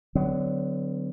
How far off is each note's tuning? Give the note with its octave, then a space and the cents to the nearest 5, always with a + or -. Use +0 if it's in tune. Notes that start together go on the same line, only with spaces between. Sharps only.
D3 +0 F#3 +0 B3 +40